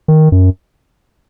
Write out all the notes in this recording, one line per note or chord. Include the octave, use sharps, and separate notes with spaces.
D#3
F#2